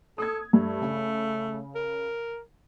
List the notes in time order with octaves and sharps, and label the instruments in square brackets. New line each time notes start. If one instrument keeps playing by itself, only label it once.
[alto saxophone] A4 [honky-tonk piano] D#6 G#6
[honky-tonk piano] G2 [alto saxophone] A3
[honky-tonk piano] C#3
[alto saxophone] A#4